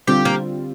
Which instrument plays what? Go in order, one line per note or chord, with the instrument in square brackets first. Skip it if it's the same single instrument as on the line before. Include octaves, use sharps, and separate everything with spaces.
[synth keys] D3 G3 C4 F4 [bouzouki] G4
[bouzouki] A#3